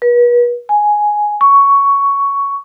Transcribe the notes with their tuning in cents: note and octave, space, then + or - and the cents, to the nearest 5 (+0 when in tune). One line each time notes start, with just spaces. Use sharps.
B4 -40
G#5 +5
C#6 +10